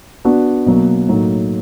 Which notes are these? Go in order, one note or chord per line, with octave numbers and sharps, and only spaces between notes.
B3 D4 F#4
B2 F#3 A#3
A2 F#3 A#3 D#4